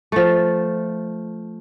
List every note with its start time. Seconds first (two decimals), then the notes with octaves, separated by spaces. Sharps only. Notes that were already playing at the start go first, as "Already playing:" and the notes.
0.12 F3 A3